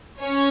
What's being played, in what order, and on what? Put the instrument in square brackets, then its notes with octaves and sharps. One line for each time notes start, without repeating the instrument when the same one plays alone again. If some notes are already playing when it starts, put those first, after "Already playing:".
[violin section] C#4 C#5